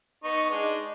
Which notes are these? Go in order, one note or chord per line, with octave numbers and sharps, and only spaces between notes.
B3 D#4 C#6
G#3 D4 D#4